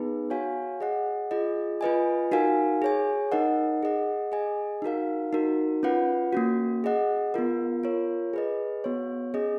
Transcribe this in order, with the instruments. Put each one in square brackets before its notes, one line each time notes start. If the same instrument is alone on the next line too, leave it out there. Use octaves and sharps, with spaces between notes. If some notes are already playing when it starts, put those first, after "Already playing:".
Already playing: [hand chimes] B3 D#4 G#4 B4
F#4 C#5 F5 G#5
G#4 D#5 F#5
F4 G#4 D#5
F4 B4 D#5 G#5
D#4 F#4 A#4 F5 G#5
G#4 C#5 G#5
D#4 A#4 D#5 F#5
G#4 D#5 F#5
G#4 D#5 G#5
D#4 F#4 A#4 F5
D#4 F#4 A#4
C#4 F4 B4 F#5
A#3 C#4 F#4
G#4 D#5 F#5
B3 F4 A#4
F4 A#4 C#5
G#4 B4 D#5
B3 F#4 C#5
C#4 G#4 D#5